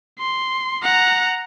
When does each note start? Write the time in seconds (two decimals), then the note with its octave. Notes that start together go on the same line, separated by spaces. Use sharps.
0.19 C6
0.83 F#5 A#5